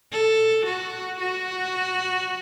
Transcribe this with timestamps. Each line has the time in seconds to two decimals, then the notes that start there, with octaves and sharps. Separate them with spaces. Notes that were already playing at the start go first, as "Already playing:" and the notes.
0.12 A4
0.66 F#4
1.20 F#4